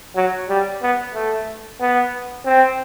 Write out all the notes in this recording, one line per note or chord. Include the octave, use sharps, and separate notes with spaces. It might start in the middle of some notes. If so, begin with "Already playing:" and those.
F#3
G3
B3
A3
B3
C4